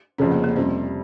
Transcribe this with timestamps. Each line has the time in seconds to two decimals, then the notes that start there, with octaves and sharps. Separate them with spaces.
0.18 F1 F2 C#3 C#4
0.31 A#3
0.44 A#3
0.56 F2 C3 G3 C#4